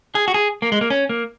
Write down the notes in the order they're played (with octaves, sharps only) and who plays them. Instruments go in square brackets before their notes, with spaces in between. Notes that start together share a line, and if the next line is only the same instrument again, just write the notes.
[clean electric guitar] G#4
F#4
G#4
A#3
G#3
A#3
C#4
A#3